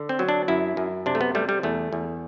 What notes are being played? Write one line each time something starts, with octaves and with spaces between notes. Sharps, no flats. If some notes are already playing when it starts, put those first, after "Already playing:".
Already playing: D3
C4
F#3
D4
F#2 E4
F#2
C3 D4
A3
B3
G3 A3
G3
E2 A3
E2